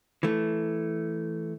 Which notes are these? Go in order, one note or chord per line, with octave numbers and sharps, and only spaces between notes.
E3 A3